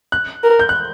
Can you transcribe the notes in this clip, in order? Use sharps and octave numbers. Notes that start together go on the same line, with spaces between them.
F#6
A#4
G6
F#6